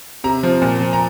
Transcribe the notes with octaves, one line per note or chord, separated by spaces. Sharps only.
C3 A#5
F3
A#2
F3
A#5